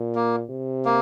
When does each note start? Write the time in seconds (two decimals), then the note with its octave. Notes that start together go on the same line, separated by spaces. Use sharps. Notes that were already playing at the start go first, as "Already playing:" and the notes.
Already playing: A#2
0.15 A#3
0.50 C3
0.85 A#3